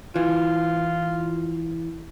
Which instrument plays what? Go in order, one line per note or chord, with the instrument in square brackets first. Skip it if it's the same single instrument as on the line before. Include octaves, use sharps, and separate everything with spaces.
[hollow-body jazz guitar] E3 [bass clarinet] F4